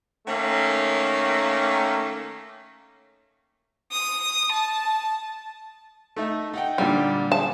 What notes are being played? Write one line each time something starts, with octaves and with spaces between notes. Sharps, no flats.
D#3 A3 A#3 C#4
D#6
A5
A3 D#4 E5
D#4 F#5 G5
A#2 D3 G3 G5
G#4 A5